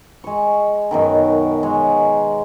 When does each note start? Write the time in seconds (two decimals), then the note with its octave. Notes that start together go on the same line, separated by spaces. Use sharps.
0.24 G#3 C#6
0.91 F#2 B2 D#3
1.63 G#3 C#5